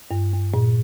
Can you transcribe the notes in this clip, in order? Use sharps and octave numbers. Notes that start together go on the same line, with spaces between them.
G2
G2
A#2